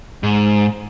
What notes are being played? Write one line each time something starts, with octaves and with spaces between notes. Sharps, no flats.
G#2